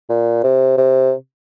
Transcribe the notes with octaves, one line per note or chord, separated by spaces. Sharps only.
A#2
C3
C3